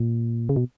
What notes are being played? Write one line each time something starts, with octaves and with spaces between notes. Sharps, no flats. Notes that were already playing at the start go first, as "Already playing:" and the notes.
Already playing: A#2
C#3
B2